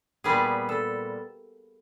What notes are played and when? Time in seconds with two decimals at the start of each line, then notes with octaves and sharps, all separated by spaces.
0.24 A#2 G3 B3 G#4
0.69 A4